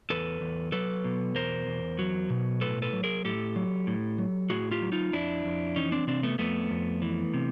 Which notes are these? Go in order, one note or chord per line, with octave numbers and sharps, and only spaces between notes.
E2 A4 B4
E2
F#3 A4 B4
B2
E2 A#4 C5
E2
F#3
B2
A2 A4 B4
A4 B4
F#3
G#4 A#4
A2 G4 A4
F#3
A2
F#3
A2 F#4 G#4
F4 G4
F#3
D#4 F4
F2 D4 E4
F2
E3 C#4 D#4
C4 D4
C3 C4 D4
A3 B3
F2 A3 B3
F2
E3
C3